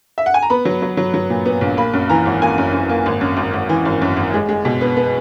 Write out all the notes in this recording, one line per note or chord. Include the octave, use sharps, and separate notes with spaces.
E5
F#5
G#5
A#5
B3 B5
F#3
F#3
F#3
F#3
A#2
B3
A#1
A#3 B5
F#2
E3 A#5
G#1
A#3 G#5
F#2
F#2
A#3
G#1
F#2
G#1
G#1
E3
G#1
F#2
G#1
G#3
G#3
B2
B3
B3